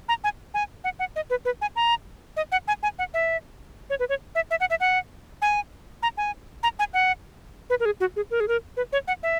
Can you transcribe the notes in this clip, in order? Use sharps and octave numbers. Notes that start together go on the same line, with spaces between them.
A#5
G#5
G#5
F#5
F#5
D#5
B4
B4
G#5
A#5
D#5
F#5
G#5
G#5
F#5
E5
C#5
B4
C#5
E5
E5
F#5
E5
F#5
G#5
A#5
G#5
A#5
G#5
F#5
B4
A#4
G#4
F#4
G#4
A#4
G#4
A#4
B4
C#5
F#5
E5